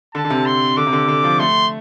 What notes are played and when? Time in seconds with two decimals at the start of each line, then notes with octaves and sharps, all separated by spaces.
0.15 D3 A5
0.25 D3
0.30 C3
0.46 C6
0.77 D3 D6
0.87 C3
0.93 D3
1.08 D3
1.24 F3
1.39 A3 C6